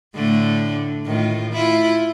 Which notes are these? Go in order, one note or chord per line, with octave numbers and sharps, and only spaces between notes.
A2 D3 A3
A2 D#3 F4
E4 F4